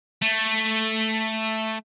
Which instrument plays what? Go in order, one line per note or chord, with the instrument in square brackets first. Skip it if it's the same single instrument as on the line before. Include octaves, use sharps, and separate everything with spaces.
[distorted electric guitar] A3